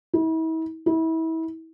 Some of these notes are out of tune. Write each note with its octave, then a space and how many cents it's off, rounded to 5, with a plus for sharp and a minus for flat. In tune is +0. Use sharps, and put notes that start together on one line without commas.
E4 -40
E4 -30